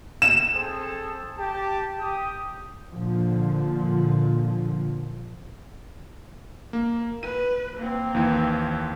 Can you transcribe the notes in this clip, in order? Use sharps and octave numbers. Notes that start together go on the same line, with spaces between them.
E7
C4 G#4 A4
G4 A5
G4 D#6
A#2 D3 F3
A#3
B4 D#7
A#3 C4
D#2 E3